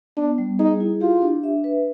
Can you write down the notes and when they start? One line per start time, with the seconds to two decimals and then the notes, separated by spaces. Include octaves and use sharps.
0.17 B3 D4
0.38 G3
0.59 D#4 G#4
0.80 E4
1.02 F4 G4
1.22 D4
1.43 E5
1.64 B4